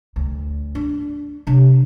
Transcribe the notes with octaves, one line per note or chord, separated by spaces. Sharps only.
D2
D4
C3 D4